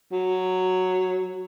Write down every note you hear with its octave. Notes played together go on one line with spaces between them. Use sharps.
F#3